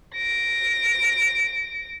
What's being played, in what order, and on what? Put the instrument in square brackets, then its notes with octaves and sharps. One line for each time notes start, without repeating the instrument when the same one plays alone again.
[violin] A#6 D7